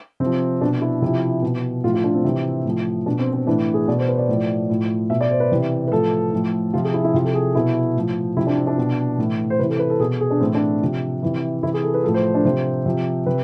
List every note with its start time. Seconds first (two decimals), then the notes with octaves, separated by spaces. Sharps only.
0.20 C3 C4
0.25 F3
0.61 B2 D4
0.82 E4
1.02 C3 F3 E4
1.42 B2
1.84 A2 F4
1.87 F3
1.94 F4
2.04 D4
2.14 C4
2.25 C3 E3
2.65 A2 F3
3.06 B2 D4
3.19 C4
3.33 C4
3.47 A2 E3 D4
3.74 G#4
3.88 B2 D5
3.98 C5
4.08 B4
4.18 D5
4.29 A2 F3
4.69 A2 F3
5.10 B2 E5
5.21 D5
5.31 C5
5.40 B4
5.51 C3 E3
5.87 B4
5.91 A2 F3 A4
6.32 A2 F3
6.73 C3 F3 F4
6.84 G#4
6.94 E4
7.04 E4
7.14 C3 F3 F4
7.24 A4
7.34 G#4
7.55 B2 E4
7.96 A2 F3
8.37 C3 E4
8.40 F3
8.47 D4
8.57 C4
8.67 D4
8.78 B2
9.18 A2 E3
9.50 C5
9.59 C3 E3 B4
9.69 A4
9.79 B4
9.90 A4
10.00 B2 G#4
10.20 G#4
10.31 D4
10.40 A2 E3 C4
10.55 D4
10.82 C3 F3
11.23 C3 E3
11.63 C3 E3 E4
11.74 G#4
11.83 A4
11.94 B4
12.03 F3 A4
12.07 A2
12.14 C5
12.34 D4
12.44 C3 F3 C5
12.86 C3 F3
13.26 C3 B4